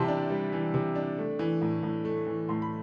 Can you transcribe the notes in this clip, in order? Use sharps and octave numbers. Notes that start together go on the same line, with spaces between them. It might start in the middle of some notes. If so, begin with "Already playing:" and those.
Already playing: C3 E3 G3 E5 G5 A5 C6
D4
G3
E3
C3
D4
A3
E3
A2
A2
A3
E3
A2 C6
B5